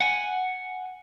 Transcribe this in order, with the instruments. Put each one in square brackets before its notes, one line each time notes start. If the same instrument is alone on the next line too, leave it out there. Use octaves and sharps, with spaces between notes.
[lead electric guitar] F#5 G#5